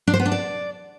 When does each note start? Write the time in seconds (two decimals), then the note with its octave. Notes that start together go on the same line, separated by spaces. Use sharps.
0.07 D4
0.13 C5
0.20 B3
0.26 D4
0.32 D5